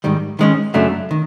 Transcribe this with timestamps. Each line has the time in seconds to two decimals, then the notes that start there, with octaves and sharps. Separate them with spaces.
0.04 G#2 D#3 G3
0.39 D#3 G#3 C#4
0.74 F#2 C#3 F#3 A3 D4
1.11 D#3